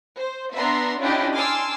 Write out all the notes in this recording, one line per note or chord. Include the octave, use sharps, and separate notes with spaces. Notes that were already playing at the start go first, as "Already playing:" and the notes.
C5
B3 D4 E5 A#5 C6
C#4 D4 E4 F4 G4 D#5
G#5 A5 C6 D6 E6 F6